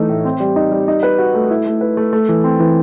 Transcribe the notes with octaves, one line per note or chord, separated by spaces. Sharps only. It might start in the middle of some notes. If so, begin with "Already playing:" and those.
Already playing: E3 A3 D#4
A2
C4
G3
D#4
G3
D#4
B4
F#4
A3
E4
A3
B4
A3
A3
E3
C4
E3